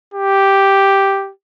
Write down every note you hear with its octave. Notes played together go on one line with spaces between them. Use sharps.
G4